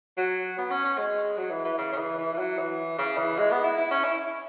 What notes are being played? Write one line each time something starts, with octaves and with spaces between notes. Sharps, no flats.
F#3
B3
C#4
C#4
G#3
F#3
E3
E3
C#3
C#3
E3
E3
E3
F#3
E3
C#3
E3
G#3
B3
E4
E4
C#4
E4